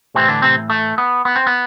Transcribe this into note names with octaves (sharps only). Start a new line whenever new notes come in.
A2 C3 E3 C4
D3 D4
C3 C4
A3
B3
B3
C4
B3